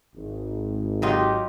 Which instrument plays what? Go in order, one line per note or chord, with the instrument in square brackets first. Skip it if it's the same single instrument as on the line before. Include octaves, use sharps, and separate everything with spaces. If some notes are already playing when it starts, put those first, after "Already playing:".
[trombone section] G#1
[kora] F#3 D#4 F4 [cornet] G4